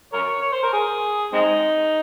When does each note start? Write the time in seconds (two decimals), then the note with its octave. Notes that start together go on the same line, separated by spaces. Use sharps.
0.13 A#4 C#5
0.42 C#5
0.52 C5
0.63 A#4
0.73 G#4
1.33 G#3 C4 D#4